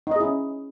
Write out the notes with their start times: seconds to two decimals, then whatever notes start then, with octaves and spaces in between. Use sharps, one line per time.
0.07 D#4
0.11 D#5
0.16 G#4
0.20 E4
0.25 C#4